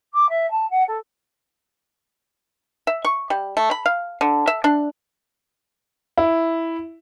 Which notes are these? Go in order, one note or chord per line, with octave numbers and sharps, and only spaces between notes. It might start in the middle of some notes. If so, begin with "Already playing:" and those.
D6
E5
A5
F#5
A4
E5
C#6
G3
A3
B5
F5
D3
E5
D4
E4